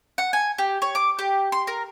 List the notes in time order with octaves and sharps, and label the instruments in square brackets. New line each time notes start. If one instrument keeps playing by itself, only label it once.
[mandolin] F#5
G#5
G4
C#5
D6
G4
C6
A#4